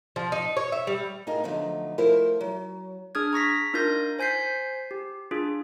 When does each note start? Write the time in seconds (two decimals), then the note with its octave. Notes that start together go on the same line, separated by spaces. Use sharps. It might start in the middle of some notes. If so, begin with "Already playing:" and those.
0.16 F3
0.32 D#4
0.57 C#5
0.72 E5
0.87 G3
1.27 A2 D#4 F4 G#4 A#4 D#5
1.44 D3 F3 F#3 A3 B3 D#4
1.98 F3 A3 E4 F4 A#4 C5
2.41 F#3
3.15 D4 G#4 D#6 F6 G#6
3.33 A#5 C#6 A#6 B6
3.74 D4 D#4 F4 A#4 G6 A#6
4.19 C5 G#5 G6 B6 C7
4.91 G4
5.31 D4 F4 G#4